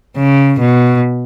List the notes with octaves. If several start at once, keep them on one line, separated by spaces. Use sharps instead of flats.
C#3
B2